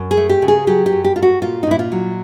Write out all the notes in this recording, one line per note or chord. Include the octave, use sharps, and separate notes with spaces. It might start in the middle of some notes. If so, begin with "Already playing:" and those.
Already playing: F#2
G#4
A3
G4
C#3
G#4
F#3 G4
G4
F#2
G4
A3 F4
F#4
A#2 F4
D#4
A#2 E4
F4
F#3